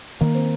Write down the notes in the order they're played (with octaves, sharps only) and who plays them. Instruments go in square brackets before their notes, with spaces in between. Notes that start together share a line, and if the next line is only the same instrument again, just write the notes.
[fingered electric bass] D#3 [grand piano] A#3
[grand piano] C4